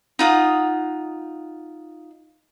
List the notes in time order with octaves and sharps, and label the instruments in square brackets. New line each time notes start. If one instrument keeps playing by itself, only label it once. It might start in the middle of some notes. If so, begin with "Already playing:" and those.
[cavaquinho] D#4 F4 F#5 D#6